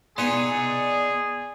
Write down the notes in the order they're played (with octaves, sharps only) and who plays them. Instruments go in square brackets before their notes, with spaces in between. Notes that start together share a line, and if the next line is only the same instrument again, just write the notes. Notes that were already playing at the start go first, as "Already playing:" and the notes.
[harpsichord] B3 D#4 G#5 [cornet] G#4 [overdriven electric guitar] D5 C6